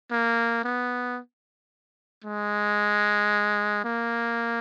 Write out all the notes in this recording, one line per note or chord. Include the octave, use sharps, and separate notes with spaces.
A#3
B3
G#3
A#3